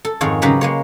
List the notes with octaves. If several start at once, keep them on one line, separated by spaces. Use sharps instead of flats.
A4
F2 G#2 D#3 G#4 C#5
C#3 F#3 G4 B4 A#5 B5
G#3 A#3 C#5